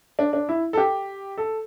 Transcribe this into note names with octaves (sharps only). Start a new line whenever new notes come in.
D4
D4
E4
A4
G4
A4